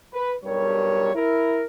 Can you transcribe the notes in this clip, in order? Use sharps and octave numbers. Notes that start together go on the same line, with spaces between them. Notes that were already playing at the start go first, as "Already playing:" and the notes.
B4
B1 G2 G3 A#4 C#5
E4 A#4